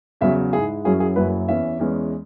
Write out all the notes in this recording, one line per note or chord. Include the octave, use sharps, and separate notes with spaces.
E2 C#3 F#3 E5
G#2 G#3 E4 G#4
F#2 F#3 C#4 E4 G#4
G#4
F#1 F#2 F#3 E4 B4
E2 E3 C#4 E5
E2 E3 G#3 C#4